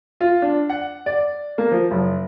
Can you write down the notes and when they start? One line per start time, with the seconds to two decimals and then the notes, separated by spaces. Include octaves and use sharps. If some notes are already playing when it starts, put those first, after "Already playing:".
0.21 F4
0.42 D4
0.69 F#5
1.06 D5
1.58 A#3
1.71 F3
1.91 F#1